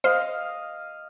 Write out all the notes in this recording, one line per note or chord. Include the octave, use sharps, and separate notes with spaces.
C5 D#5 F5